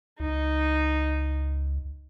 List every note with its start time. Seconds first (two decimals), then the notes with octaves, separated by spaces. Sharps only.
0.20 C#2 D#4